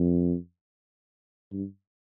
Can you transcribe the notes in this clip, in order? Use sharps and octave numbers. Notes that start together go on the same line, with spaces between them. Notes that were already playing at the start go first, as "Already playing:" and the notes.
Already playing: F2
G2